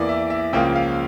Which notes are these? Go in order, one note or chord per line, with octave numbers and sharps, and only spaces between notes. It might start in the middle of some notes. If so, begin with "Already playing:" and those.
Already playing: E2 E3 A#3 D5
E5
E5
C#2 C#3 F3 A#3 G5
F5